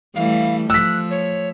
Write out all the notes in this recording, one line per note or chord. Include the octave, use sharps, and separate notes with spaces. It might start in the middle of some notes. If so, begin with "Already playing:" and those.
E3 G3 A3 F5
F3 E6 F#6 B6
C#5